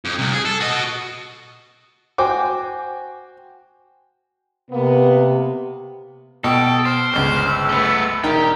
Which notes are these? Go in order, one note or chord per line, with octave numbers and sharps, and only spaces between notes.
F2
C2 C3
G#4
A4
F#4 D#5
F#4 C5 G5 G#5 D6
C3 A#3 B3
B2 A4 G5
C5 F6
G1 C#2 F6
E6
A3 B3
E1 D#4 G4 A#4 G5